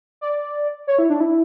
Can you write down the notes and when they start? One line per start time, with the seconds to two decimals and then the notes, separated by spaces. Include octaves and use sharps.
0.21 D5
0.87 C#5
0.99 E4
1.10 D4
1.20 E4